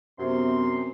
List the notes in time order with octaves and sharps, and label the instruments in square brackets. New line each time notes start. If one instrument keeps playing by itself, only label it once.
[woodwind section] F#2 C3 C6 [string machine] B3 C4